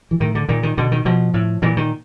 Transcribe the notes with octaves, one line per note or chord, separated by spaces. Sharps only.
E3
A2 D#3
D3
A#2 D#3
D#3
B2 D3
D#3
B2 F3
A2
A#2 E3
D#3